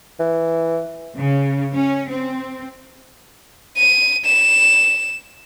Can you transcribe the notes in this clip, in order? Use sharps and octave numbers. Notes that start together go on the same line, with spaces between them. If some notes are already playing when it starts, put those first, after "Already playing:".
E3
C#3
C#4
C4
D#7
E7